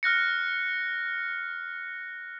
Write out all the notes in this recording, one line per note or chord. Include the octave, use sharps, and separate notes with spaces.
F6 F#6 A#6 C#7